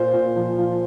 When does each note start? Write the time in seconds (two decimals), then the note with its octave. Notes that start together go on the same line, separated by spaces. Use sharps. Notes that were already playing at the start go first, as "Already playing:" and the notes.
Already playing: A#2 C5
0.13 A#2
0.36 F3
0.58 F3